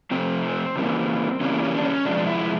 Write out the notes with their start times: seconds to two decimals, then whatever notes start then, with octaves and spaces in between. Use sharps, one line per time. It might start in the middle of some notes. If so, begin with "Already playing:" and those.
0.11 C3 F3 A3 C4
0.76 C#3 E3 G3 A#3
1.41 C#3 E3 G3 A#3 C#4
1.63 C#4
1.76 D4
1.84 C#4
2.05 C3 F3 G#3 D4
2.27 E4